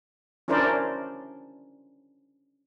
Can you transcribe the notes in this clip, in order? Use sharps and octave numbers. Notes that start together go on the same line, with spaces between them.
C#4 D4 E4 A#4 C5 D5